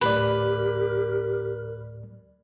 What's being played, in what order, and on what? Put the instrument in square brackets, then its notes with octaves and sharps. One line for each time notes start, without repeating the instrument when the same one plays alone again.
[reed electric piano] D2 A2 D5 [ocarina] G4 [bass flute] A#4 [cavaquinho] B4